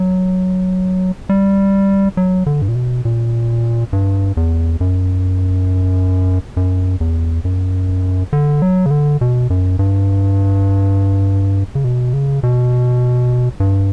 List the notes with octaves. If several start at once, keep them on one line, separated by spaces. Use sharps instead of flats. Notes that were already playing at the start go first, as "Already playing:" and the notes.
Already playing: F#3
G3
F#3
D3
G2
A#2
B2
A#2
G2
E2
F#2
F#2
E2
F#2
D3
F#3
C#3
D3
B2
F#2
G2
C#3
B2
C#3
B2
G2